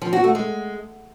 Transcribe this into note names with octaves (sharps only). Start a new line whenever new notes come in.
F3
F#4
A3
G#3